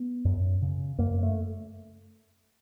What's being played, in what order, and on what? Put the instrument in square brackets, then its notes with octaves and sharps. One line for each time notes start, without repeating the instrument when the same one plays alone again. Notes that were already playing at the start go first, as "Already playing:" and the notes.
Already playing: [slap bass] B3
F#2
C#3
F#2 A#3
A3